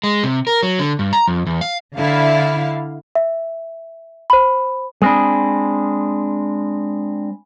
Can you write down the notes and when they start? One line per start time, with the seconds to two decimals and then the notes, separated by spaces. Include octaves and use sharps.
0.04 G#3
0.24 C3
0.47 A#4
0.63 F#3
0.79 D3
0.99 G2
1.13 A#5
1.28 F2
1.46 E2
1.61 F5
1.97 D3 E4 F5
3.15 E5
4.30 C5 B5
5.02 G#3 C4 D4 G#5 B5